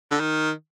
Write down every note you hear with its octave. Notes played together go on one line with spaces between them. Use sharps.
D3
D#3